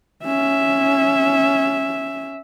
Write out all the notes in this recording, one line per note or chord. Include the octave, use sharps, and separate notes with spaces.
C#4 E5